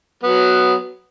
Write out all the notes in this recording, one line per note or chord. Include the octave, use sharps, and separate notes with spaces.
F#3 B3